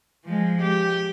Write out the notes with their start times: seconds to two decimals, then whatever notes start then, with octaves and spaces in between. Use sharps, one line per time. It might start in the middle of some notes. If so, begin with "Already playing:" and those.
0.25 F3 G#3
0.62 G4